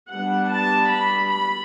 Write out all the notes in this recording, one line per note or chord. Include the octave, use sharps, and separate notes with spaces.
G3 B3 D4 F#5
A5
B5
B5